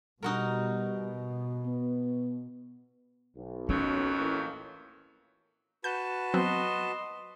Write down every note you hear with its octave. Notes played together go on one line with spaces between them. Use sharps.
B2 G3 D#4 F#4 A#4
B3
B1
F2 D#3 F#3 C#4
A2 E3 A#3
F#4 B4 A5 G6
F#3 B3 C4 D#5 C6